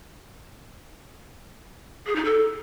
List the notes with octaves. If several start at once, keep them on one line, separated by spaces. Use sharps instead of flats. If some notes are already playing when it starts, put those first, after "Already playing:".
G#4
D#4
A4